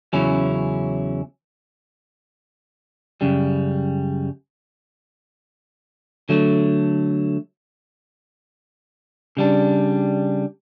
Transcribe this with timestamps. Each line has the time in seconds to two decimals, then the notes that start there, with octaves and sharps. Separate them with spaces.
0.13 E2 C#3 F#3 C#4 E4
3.21 F#2 C#3 G3
6.29 D3 F#3 A3
9.37 C#3 G3 D4